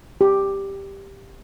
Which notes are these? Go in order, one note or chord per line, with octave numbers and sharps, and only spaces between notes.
G4